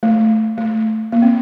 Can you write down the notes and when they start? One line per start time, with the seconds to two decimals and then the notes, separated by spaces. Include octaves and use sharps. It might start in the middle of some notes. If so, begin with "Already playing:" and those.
0.03 A3
0.58 A3
1.12 A#3
1.22 C4